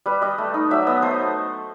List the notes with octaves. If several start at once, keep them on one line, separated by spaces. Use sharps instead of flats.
G3 B4
G3 D#5
A3
D#4
F#3 E5
B3 D#5
A3 C5